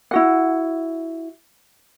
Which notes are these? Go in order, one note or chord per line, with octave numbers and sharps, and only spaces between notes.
E4 F#4 F#5